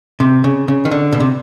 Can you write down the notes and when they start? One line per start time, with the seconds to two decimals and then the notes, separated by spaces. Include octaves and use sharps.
0.20 C3
0.44 C#3
0.68 C#3
0.85 D#3
0.91 D3
1.12 B2
1.20 C3